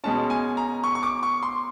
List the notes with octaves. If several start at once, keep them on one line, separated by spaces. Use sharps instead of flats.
B2 G#3 C#4 A5
G#5
A#5
C#6
C#6
D6
C#6
C6